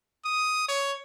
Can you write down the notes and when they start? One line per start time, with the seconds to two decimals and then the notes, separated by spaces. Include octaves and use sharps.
0.25 D#6
0.68 C#5